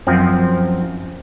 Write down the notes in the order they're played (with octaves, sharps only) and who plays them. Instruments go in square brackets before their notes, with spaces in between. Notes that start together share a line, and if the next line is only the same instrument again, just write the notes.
[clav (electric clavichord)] F#2 F3 C4